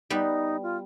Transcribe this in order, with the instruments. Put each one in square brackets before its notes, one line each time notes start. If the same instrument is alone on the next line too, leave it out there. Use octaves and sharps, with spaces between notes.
[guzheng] G3 B3 [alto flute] D#4
[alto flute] F4